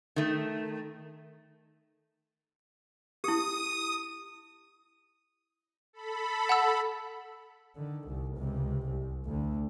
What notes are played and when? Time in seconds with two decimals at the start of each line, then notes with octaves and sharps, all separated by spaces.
0.16 D#3 A3
3.24 E4 G4 D#6
5.93 A4 B5
6.49 F#5 A5 E6
7.76 D3 D#3
8.08 C2
8.38 C#2 C3
8.87 C2
9.25 D2 D3